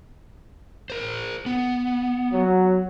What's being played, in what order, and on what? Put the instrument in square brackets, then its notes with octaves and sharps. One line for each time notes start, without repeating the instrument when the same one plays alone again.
[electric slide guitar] A#4 C5
B3
[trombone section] F#3